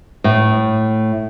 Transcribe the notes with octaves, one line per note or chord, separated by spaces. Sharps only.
A2